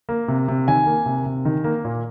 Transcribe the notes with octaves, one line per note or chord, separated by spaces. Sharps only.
A#3
C3
C3
D#3 G#5
A#3
C3
C3
D#3
A#3
A#2